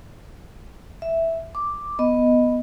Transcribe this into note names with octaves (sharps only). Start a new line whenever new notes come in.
E5
D6
B3 D#5